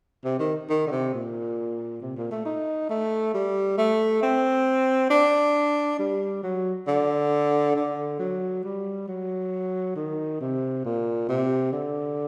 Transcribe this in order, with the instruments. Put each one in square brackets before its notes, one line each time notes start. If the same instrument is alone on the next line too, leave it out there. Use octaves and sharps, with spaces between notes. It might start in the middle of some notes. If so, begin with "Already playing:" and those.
[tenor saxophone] C3
D#3
D#3
D3
C3
A#2
C3
A#2
A3
D#4
A3
G3
A3
C4
D4
G3
F#3
D3
D3
F#3
G3
F#3
D#3
C3
A#2
C3
D3